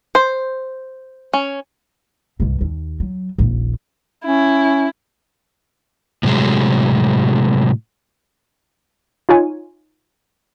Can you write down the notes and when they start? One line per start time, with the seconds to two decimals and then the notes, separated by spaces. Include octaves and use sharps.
0.15 C5
1.33 C#4
2.40 C2 G2
2.61 D#2
3.00 F#3
3.38 D#1 A#1
4.25 C#4 E4
6.23 A2 C3 F#3 G#3
9.29 D#4 F4 C#5 G#5